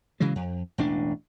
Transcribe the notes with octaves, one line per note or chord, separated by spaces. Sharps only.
C#3 E3 F#3 G#3
F2
E1 A1 D4